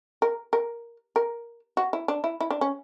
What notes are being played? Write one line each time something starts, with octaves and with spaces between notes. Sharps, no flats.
A#4
A#4
A#4
F#4
E4
D4
E4
E4
D4
C#4